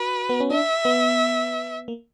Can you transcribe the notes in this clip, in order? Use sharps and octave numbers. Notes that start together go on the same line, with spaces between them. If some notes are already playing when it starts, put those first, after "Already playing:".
Already playing: F#4 B4
B3
C#4
D4 E5
B3
A#3